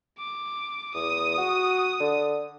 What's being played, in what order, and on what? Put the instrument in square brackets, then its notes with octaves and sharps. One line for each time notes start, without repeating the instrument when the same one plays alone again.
[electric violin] D6
[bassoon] E2 [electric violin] D#6
[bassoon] F#4
D3